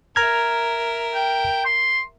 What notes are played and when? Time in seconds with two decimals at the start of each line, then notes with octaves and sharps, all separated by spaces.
0.16 A#4 E5 A#5 F6 G#6
1.14 G5
1.66 C6